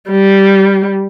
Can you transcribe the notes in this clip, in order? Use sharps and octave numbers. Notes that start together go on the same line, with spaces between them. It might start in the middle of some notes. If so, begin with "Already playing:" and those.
G3